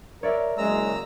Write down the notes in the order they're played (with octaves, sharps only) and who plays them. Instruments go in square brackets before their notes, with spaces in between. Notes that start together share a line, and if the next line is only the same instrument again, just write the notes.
[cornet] A#4 [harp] C#5 D5 E5
[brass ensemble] F#1 [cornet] G#3 [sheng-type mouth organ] A#5 E6